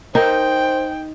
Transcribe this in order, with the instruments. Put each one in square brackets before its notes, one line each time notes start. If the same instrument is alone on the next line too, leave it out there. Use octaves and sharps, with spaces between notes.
[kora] D#4 [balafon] A#4 [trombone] C5 [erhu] G5